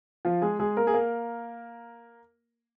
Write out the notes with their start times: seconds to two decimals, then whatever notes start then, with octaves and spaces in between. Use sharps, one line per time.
0.25 F3 F4
0.42 G#3 G#4
0.59 G#3 G#4
0.77 A#3 A#4
0.87 G#4
0.94 A#3 A#4